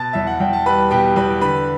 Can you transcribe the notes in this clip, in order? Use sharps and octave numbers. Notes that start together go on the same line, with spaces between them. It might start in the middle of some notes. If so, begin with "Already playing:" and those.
Already playing: B2 A5 A6
E2 E5
F#5
E2 G5
A5
G3 B4 B5
B2 G4 G5
E2 B4 B5
D3 B4 B5